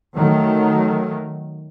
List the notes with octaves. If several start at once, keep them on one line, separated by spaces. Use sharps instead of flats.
D#3 F#3 A3